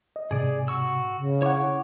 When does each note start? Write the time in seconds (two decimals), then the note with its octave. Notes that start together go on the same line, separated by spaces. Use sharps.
0.16 D#5
0.31 G#2 C3 G#4 D5
0.68 F#4 C#6 E6
1.17 C#3
1.42 E4 C#5 F#5 C#6 D6